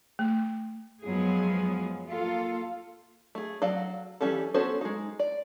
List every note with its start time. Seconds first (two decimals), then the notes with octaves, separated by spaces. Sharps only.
0.19 A3
1.05 F#2 F3 F#3 G#3 B3 G#4
2.08 A#3 F4 A4
3.35 A3 G#4
3.62 F#3 A4 D5 F5
4.21 E3 G3 C#4 G4 A4
4.54 B3 C#4 F#4 A4 C5
4.81 G#3 D#4
5.19 D5